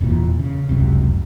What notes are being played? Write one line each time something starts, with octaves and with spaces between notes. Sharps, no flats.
E1 E2 A#2 E3
C#3
F1 C#2 F#2 C3